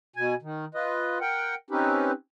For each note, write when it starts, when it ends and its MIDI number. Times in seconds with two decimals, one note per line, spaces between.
0.16 0.34 47
0.16 0.34 80
0.42 0.65 51
0.74 1.18 65
0.74 1.18 71
0.74 1.18 75
1.21 1.55 70
1.21 1.55 78
1.21 1.55 79
1.70 2.12 60
1.70 2.12 61
1.70 2.12 63
1.70 2.12 67
1.70 2.12 71